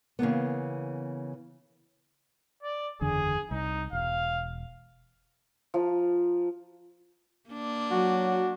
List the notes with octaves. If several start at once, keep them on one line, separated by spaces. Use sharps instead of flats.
C#3 E3 A#3 B3
D5
F#1 E2 D3 G#4
C2 D#4
E1 F5
F3 A#5
A#3 D4
F#3 F#4